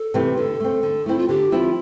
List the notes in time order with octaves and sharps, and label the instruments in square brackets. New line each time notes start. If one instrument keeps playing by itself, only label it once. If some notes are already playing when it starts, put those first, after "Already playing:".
Already playing: [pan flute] A4
[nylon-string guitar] C3 E3 A3 C4
[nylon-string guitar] D3 [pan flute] A4
[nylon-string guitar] A3 C4
D3
[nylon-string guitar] A3 C4 [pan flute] E4
[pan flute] F4
[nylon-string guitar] D3 [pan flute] G4
[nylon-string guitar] F3 C4 E4 [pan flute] F4